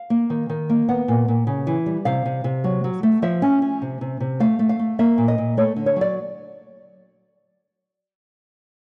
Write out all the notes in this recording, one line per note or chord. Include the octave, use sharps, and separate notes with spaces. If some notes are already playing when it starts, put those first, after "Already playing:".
Already playing: F5
A#3
D#3
D#3
A#3
B3 F#5
A#2
A#2
C#3
E3
G3
C3 F5
C3
C3
F#3
F#3
A3
F3 E5
C#4
C#4
C3
C3
C3
A3 F5
A3
F5
A3
A#3 E5
A#2
D#5
A#2
A3 C#5
D3
C#5
F#3 D5